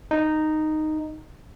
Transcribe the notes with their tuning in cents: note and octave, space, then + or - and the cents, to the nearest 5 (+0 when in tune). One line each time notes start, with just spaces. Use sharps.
D#4 -5